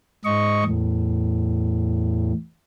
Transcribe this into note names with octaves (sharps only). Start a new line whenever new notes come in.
G#2 D#5 C#6
E2 A2